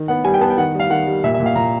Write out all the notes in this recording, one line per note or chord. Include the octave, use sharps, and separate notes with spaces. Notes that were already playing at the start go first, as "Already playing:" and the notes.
Already playing: D#3
B3 F#5
G3 G#5
G5
B3 A5
G5
D#3 F#5
G3 F5
D#3 F#5
G3
A#2 E5
E5
A#2
F5
A#2 A#5